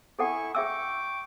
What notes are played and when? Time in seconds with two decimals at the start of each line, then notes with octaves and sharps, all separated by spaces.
0.19 E4 G#4 A4 F#5 G#5 C#6
0.55 G#4 E5 G5 C#6 D6 E6